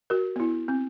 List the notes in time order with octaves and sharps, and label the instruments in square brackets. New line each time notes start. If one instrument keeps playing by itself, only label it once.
[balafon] F#4 A#4
B3 E4
C4